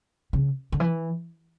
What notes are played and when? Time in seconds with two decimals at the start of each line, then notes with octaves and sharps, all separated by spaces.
0.33 C#3
0.72 D3
0.80 E3